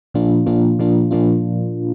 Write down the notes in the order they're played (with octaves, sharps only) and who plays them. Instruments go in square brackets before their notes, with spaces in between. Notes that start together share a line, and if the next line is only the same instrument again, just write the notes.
[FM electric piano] A#2 F3 A#3 D4 F4
A#2 F3 A#3 D4 F4
A#2 F3 A#3 D4 F4
A#2 F3 A#3 D4 F4